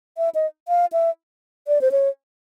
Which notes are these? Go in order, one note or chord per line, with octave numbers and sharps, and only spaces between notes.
E5
D#5
F5
E5
D5
C5
C#5